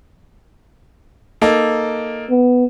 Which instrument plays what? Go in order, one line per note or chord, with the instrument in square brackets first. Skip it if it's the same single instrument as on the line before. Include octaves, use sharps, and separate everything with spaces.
[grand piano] A#3 D#4 A4
[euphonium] B3